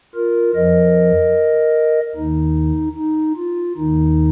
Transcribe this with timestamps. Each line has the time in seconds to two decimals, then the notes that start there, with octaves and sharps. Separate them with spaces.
0.15 F4 A#4
0.55 F2 F3 A#4 D#5
2.16 D#2 D#3 D#4
2.96 D#4
3.37 F4
3.77 D#2 D#3 D#4